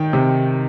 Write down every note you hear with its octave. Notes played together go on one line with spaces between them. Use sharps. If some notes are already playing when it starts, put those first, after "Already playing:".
Already playing: D#3 G5
C3